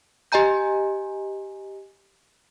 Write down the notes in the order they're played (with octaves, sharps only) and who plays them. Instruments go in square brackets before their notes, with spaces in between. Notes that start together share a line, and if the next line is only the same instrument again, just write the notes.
[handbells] G4 D#5 G#5 A#5 G6